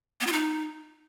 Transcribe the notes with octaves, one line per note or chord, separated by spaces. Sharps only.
B3
F4
D#4